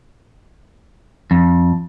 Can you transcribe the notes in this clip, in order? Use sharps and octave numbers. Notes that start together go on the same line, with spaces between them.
F2